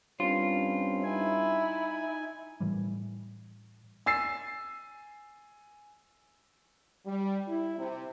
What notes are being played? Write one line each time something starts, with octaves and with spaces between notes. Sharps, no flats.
G2 C4 C#4 F4
D#4 E4 G#5
A2 E3 G3
G#5 E6 A6 C7
G3
E4
C3